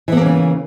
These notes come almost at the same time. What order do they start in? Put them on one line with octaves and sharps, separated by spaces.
E3 B3 A#3 C#4 C#3